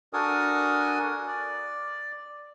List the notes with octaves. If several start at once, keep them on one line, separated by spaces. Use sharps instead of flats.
D4 F#4 A4 A#4 G#5 D#6
D5